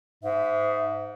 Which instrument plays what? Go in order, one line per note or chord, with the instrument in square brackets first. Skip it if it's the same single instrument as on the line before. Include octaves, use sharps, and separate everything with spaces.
[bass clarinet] G#2 [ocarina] E5